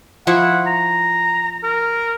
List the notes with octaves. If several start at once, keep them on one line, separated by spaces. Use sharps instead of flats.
F3 E4 F#5 C#6
A#5
A#4